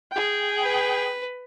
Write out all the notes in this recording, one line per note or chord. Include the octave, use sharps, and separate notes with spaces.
G#4 G5
B4